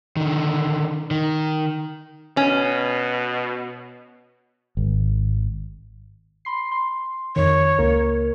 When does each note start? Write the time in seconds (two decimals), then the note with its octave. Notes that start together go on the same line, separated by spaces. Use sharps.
0.17 D3 D#3
1.11 D#3
2.37 B2 C#4
4.77 G#1
6.45 B5 C6 C7
6.72 C6
7.36 F2 D#3 C#5
7.79 C#2 A#3 A#4